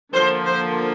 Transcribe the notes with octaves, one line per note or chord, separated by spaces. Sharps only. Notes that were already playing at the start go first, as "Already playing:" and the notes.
D3 F3 A#3 C5
C5